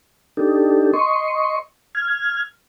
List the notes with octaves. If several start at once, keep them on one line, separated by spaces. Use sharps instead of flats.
D4 D#4 G4 A4
D#5 C6 C#6
F6 G#6